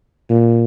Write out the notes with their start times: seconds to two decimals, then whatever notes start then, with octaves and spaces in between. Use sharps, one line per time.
0.30 A#2